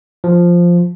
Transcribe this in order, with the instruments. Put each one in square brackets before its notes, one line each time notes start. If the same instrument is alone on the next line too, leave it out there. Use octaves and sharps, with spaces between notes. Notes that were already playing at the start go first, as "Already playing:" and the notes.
[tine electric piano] F3